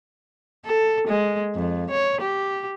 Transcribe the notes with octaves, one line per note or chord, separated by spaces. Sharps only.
A4
G#3
F2
C#5
G4